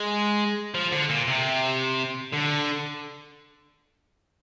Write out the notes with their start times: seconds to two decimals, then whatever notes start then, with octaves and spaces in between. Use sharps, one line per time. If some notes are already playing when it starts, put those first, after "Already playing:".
Already playing: G#3
0.74 F3
0.92 D3
1.09 A#2
1.27 C3
2.33 D3